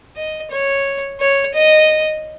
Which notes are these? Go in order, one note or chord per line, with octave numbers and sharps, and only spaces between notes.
D#5
C#5
C#5
D#5